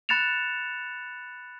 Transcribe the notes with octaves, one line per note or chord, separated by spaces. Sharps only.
B5 F#6 A6 C#7 E7 F7